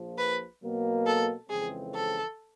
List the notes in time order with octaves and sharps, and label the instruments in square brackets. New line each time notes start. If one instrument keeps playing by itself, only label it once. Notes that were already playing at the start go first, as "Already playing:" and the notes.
Already playing: [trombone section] A#1 A#2 F3
[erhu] B4
[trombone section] B2 F#3 A#3
[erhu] A4
[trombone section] F2 C#3 E3 G#3 C4 [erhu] G#4
[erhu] A4